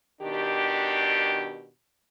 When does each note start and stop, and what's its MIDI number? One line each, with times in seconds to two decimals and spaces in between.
0.21 1.69 47
0.21 1.69 51
0.21 1.69 62
0.21 1.69 67